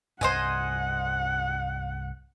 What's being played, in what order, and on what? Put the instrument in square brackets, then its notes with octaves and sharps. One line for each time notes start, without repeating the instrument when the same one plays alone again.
[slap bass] C2 G2 [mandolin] C5 D#5 G#5 [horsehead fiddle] F#5